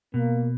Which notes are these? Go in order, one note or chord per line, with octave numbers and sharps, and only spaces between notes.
B2 A#3